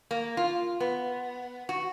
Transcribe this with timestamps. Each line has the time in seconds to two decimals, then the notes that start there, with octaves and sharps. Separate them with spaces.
0.11 A#3
0.37 F4
0.80 B3
1.69 F#4